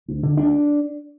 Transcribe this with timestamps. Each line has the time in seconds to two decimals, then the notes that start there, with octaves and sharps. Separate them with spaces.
0.08 D2
0.23 D3
0.37 D2 D4